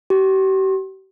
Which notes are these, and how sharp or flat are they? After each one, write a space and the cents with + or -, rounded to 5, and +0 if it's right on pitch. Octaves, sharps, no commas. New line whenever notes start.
G4 -40